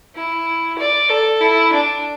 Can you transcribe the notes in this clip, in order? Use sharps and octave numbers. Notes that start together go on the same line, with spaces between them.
E4
D5
A4
E4
D4